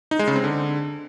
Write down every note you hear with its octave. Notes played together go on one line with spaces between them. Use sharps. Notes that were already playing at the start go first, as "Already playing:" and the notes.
D#4
G#3
C#3
C4
D3